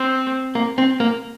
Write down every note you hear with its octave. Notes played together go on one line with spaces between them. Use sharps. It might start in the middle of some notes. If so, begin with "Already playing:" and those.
Already playing: C4
A#3
C4
A#3